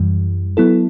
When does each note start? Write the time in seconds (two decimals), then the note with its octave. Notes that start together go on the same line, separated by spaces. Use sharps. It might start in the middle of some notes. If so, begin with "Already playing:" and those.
Already playing: F#2 E3 G3
0.57 F#3 B3 E4 A4